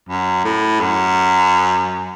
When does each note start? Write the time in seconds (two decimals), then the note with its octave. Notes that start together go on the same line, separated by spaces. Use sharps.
0.09 F#2
0.44 A2
0.80 F#2